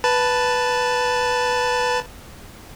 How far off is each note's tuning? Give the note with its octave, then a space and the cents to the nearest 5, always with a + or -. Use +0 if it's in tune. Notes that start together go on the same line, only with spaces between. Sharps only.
B4 +0 A5 +0